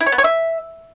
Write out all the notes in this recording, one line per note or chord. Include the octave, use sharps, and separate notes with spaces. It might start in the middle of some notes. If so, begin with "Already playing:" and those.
E4
C#5
B3
C#5
E5